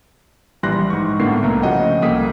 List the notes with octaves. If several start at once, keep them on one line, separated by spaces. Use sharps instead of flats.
A#1 E3 G3 C6 F#6 A#6
G#2 C#6
A2 D3 A#3 B3 A#4 C7
C2 A3 A#3 A#4 A#5
C#3 F3 F#4 D#5 F#5 G5
C2 A#3 G#4 A4 D#6 B6